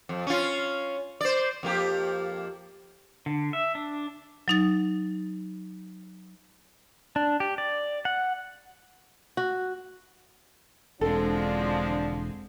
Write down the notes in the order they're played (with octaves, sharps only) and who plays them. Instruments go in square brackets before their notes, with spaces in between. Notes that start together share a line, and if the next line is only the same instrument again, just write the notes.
[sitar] F2
C#4 F4
C5 D5
F2 A#3 G4
[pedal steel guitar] D3
E5
D4
[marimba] F#3 D#4 A6
[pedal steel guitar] D4
G4
D5
F#5
[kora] F#4
[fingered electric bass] E1 [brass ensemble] D3 F3 D4 [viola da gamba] G#3 C4 [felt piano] A4